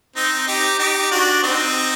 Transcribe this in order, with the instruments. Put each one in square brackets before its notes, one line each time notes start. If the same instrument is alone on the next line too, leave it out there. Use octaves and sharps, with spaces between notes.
[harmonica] C4 D#4
D#4 G4
D#4 G4
D4 F#4
C4 D#4